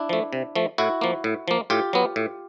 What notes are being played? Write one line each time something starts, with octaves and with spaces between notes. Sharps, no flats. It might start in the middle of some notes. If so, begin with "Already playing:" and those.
Already playing: D4 E4
F3 A3
C3
F3 A3
A2 E4 F#4
F3 A#3
A2
F3 A#3
A2 F4 G4
F#3 B3
A2